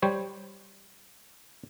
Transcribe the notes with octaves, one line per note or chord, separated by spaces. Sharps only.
G3 C5 C#5